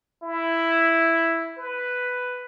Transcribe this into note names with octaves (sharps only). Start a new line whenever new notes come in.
E4
B4